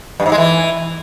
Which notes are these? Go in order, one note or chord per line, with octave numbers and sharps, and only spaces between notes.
G2
G#2
G#3
E3